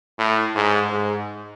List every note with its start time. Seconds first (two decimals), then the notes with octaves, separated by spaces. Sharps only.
0.19 A2
0.55 G#2
0.90 G#2